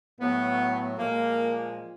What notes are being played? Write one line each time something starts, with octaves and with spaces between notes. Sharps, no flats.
A2 F#3 B3
A#2 F3 G#3 A#3